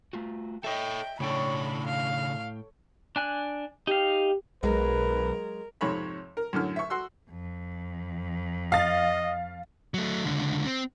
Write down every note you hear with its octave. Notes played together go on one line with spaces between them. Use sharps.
A3 F4 F#4
A4 C#5 D#5 E5 G5
A2 C#3 D4 A4 C#5 G5 B5
F5
D4 G#5 F#6
D#4 G4 F5
B1 F#3 G#3 A#4 B4
F2 G#2 C3 C#5 B5
A#4
F#2 A2 D3 F6
E5 C#6
F#4 C6 E6
F2
D#5 F5 A6
F#3 A3
C#2 D3
C4